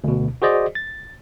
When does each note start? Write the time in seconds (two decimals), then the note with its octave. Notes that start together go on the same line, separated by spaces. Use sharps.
0.04 D2 B2
0.42 F#4 G#4 C5 D5 D#5
0.75 A6